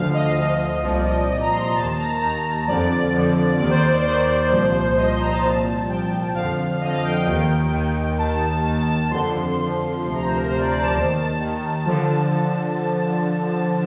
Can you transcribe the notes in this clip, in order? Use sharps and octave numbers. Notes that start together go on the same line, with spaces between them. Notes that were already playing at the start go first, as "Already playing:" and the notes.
Already playing: D2 D3 F3 F5
D#5
D2 D3 F3 F5
C2 A#2 F3 D#5
D5
D#5
C2 A#2 F3 D#5
A#5
C6
A#5
D#2 D#3 A5
A#5
D#2 D#3 A#5
F2 D3 F3 D5
F2 D3 F3
D#2 D#3 D5
C5
D5
D5
D#2 D#3 C5
C2 A#2 F3
C2 A#2 F3 D#5
C6
A#5
A5
C2 A#2 F3 A5
C2 A#2 F3 G5
F2 D3 F3 F5
F2 D3 F3 D#5
F5
G5
G5
D#2 D#3
D#2 D#3
D#2 D#3 A5
D#2 D#3 A5
F2 D3 F3 C6
F2 D3 F3
D2 C3 F3 C6
A#5
C5
A#4
D2 C3 F3 C5
D5
D5
A5
D#2 D#3 A5
D#2 D#3
D3 F3